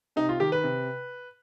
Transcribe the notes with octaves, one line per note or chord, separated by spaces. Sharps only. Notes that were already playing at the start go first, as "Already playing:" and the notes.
C3 D#4
F4
D#3 G4
B4
C3